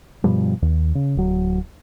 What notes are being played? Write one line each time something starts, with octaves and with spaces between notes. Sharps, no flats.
G2 B2 F3 G3
D#2
C#3
D1 F#3